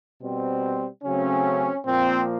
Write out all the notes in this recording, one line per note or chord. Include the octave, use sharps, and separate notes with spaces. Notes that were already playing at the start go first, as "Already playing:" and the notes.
B2 G3 C4
C#3 F#3 A3 C4 C#4
A#2 F3 A#3 C4